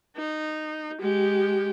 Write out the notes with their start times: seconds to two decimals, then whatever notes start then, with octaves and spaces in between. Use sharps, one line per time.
0.17 D#4
1.00 G#3 G4